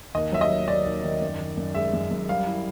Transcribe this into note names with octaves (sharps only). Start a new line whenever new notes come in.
D#2 D#5
F#3 E5
D#5
F#3
D#2 D5
D#2
D#3
F#2
D#3
F#2
G#3 E5
F#2
F#2
G3 F5
E4